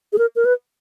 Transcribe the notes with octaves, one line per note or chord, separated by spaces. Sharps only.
G#4
A#4
A#4
B4